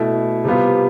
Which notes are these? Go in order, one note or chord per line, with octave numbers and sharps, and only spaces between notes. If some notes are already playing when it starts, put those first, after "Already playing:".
Already playing: B2 A3 E4
C3 G3 B3 F4